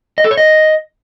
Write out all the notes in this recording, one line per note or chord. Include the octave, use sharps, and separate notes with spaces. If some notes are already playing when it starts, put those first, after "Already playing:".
D#5
A4
C#5
D#5